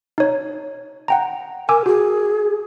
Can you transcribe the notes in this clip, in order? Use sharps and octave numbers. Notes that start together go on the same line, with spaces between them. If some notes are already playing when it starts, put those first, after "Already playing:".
D#4 C#5
F#5 G5 A#5
A#4 G#5 D6 E6
F#4 G#4